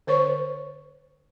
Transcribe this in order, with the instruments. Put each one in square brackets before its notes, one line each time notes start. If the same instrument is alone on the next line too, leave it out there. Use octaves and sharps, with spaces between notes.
[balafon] D3 A#4 C5 C#5 C#6